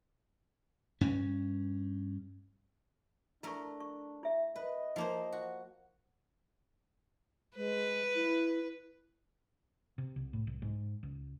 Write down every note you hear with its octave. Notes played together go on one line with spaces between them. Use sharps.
G2 C#4
A3 D4 E4 A#4 C#6
C#6
E4 E5
B4 D#5
F3 A#3 C5
F#4
G#3 B4
E4
C3
C2
A2
C2
G#2
C#2